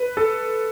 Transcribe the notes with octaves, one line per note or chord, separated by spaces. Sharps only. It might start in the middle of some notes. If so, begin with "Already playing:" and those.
Already playing: B4
A4